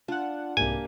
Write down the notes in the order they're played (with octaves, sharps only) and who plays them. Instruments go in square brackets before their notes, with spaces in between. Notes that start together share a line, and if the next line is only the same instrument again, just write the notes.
[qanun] D4 [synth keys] F4 F#5
[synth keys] C2 G#2 [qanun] A#3 G4 [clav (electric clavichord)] G#5